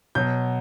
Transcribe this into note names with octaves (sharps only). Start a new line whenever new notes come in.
B2 F#3 G6